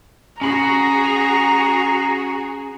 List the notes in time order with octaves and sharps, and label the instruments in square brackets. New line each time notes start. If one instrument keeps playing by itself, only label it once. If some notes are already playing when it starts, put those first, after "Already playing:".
[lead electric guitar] C#4 B5 [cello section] F#4 G#4 [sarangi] A#5